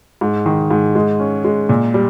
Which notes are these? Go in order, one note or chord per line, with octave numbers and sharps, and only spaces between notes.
G#2
D#3
G#2
G#3
C#4
G#3
A#2
G3